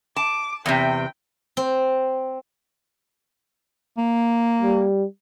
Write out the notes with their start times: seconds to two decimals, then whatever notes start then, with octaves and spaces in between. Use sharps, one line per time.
0.16 A5 D6
0.66 E2 C3 G5
1.57 C4
3.98 A#3
4.62 G3